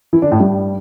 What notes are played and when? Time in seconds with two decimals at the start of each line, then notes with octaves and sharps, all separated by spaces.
0.13 E3 E4
0.22 D3 D4
0.31 A2 A3
0.40 G2 G3